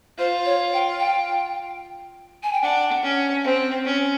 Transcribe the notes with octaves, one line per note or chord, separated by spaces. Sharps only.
F4 C5
C#5
G5
G5
G#5
G5
D4 F#5
C#4
C4
C#4